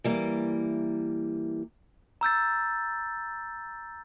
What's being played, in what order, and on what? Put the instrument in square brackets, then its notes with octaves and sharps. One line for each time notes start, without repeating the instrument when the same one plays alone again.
[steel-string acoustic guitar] E3 G3 A#3
[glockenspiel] A#5 E6 G6 A6